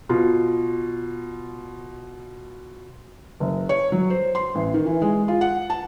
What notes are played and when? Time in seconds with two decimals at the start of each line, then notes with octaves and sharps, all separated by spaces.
0.09 B2 F4
3.40 F#1
3.69 C#5
3.92 F#3
4.10 C5
4.35 C6
4.55 A1
4.74 D#3
4.86 E3
5.02 G#3
5.28 F4
5.41 F#5
5.70 A5